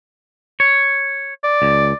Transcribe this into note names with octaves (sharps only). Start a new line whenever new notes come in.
C#5
D5
C#2